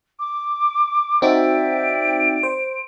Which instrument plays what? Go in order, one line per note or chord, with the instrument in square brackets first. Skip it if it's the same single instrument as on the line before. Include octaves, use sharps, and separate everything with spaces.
[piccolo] D6
[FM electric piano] C4 D#4 F#4 [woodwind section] D5 E5 G5 [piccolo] D7
[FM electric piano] C5